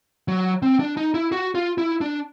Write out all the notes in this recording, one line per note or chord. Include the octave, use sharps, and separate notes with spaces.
F#3
C4
D4
D#4
E4
F#4
F4
E4
D4